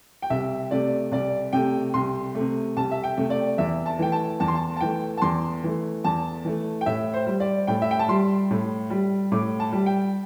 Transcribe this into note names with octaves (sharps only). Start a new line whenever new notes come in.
G5
C2 E5
C3 A3 D5
C2 D5
C3 A3 G5
C2 C6
A3
C3
C2 A5
E5
G5
C3 A3
D5
E2 E5
A5
E3 A3 G5
A5
E2 A5
C6
A5
A5
E3 A3 G5
A5
E2 C6
E3 A3
E2 A5
E3 A3
G5
A2 E5
C5
G3
D5
A2 G5
E5
G5
A5
G3 C6
A2
G3
A2 D6
A5
G3
G5